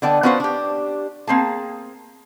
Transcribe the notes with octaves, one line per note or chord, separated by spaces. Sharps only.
D3 B3 D5 G5 A5
B3 C#4 F4 F#4 B4 C5
D4 G4
A#3 C4 G#4 A5